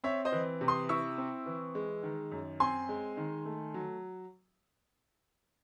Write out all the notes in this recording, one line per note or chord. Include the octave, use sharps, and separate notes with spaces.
C4 C#5 E5
C5 D#5
E3
C3
C6 D#6
E4 C#6 E6
C4
E3
G#3
D#3
F#2
C4 G#5 C6
G#3
D#3
A3
F#3